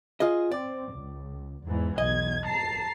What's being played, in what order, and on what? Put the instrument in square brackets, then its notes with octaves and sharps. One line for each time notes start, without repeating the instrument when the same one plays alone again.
[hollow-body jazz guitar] F4 G#4 D#5
[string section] C4 [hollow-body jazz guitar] D5
[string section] C#2
E2 G#2 E3
[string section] B1 E2 G#6 [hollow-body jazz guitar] D#5
[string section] A5 A#5 C7